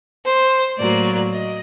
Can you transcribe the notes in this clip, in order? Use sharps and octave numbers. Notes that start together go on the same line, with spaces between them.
C5
A2 F#3 A#3 D5
D#5